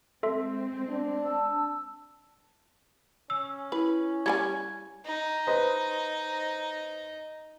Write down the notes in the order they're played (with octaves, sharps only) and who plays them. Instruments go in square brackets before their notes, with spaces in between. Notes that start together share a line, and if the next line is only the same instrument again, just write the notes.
[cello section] G#3 C4 [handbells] A4 E5 C6
[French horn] D4
[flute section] A5 E6
[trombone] C#4 [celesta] E6
[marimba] E4 [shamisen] B4
[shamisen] G3 A4 G#5 [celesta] G#6
[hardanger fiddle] D#4
[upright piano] B4 C5 D#5